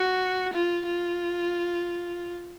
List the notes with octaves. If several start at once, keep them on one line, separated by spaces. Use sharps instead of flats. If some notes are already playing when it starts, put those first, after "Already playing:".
Already playing: F#4
F4
F4